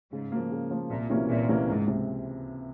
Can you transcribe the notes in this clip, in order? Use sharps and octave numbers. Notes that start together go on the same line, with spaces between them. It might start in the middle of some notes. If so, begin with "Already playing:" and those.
G#2 C#3
F3 A#3
C#3
F3 A#3
C2 A#2
C3 E3 A#3 C#4
C2 A#2
C3 E3 A#3 C#4
C#2 G#2
C3